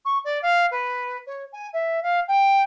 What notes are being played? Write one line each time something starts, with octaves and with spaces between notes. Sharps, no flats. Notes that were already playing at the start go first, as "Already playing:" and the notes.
C#6
D5
F5
B4
C#5
G#5
E5
F5
G5